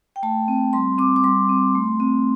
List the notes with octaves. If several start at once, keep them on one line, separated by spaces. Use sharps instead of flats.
G5
A3 A5
C4
G3 C6
C4 D6
D6
G3 C6
C4
A3
C4